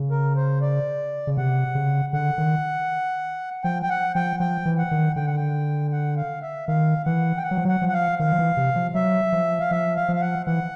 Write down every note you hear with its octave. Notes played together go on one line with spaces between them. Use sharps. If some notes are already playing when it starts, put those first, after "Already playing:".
Already playing: C#3
A#4
C5
D5
C#3
C3 F#5
C#3
D3 F#5
D#3
F3 G5
G5
F#5
F3 G5
F3 G5
E3
F#5
D#3
D3 G5
F#5
G5
F#5
F5
E5
D#3 F5
E3 F#5
G5
F#5
F#3
F3
F#3 F#5
F3
F#5
F5
D#3 F5
F3
E3
C3
F3
F#3 E5
F3
F5
F3 E5
F5
F3
F5
F#5
E3 F#5